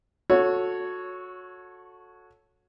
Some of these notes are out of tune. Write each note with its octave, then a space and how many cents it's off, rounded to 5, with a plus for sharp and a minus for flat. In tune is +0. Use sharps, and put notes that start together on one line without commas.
F#4 -20 A4 +0 C#5 +0